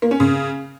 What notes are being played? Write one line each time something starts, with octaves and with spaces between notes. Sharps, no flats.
A#3
C#4
C#3